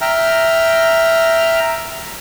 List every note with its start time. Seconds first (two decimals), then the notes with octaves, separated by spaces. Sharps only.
0.01 E5 G5 A#5 F6